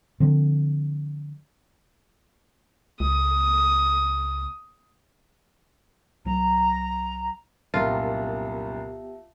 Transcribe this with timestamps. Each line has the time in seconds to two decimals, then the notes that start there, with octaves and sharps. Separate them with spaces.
0.20 D3 F3 C4
3.00 C#2 D#6
6.25 C2 F#3 A#5
7.74 C2 F#2 A#2 B3 F4 G4 E5 A5